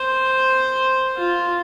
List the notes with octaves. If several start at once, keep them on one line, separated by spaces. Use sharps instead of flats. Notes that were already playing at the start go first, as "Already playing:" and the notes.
Already playing: C5
F4